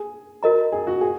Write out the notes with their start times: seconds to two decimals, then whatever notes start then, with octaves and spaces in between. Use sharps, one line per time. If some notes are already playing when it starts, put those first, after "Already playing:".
Already playing: G#4
0.43 F#4 A#4 D#5 A#5
0.72 G#4
0.87 F#4
1.01 G#4